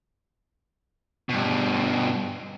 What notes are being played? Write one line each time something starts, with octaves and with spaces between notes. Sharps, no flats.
G2 B2